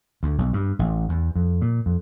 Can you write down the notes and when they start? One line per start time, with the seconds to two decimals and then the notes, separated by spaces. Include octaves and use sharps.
0.23 D2
0.38 B1
0.53 G2
0.79 A1
1.09 E2
1.36 F2
1.62 A#2
1.86 F2